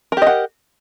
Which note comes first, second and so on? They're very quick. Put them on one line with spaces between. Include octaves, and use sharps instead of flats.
A#4 G4 D#5 F#5